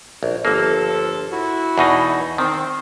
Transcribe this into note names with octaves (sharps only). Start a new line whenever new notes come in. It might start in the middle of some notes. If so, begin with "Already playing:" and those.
A#1
G1 F3 A#3 A4
E4 F#4
E2 B2 D#4
D#3 C4